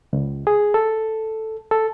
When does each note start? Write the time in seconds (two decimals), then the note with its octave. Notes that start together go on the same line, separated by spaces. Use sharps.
0.13 C#2
0.47 G#4
0.74 A4
1.71 A4